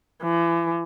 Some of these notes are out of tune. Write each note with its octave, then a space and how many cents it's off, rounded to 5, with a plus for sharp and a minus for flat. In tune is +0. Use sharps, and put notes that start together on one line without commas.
E3 +40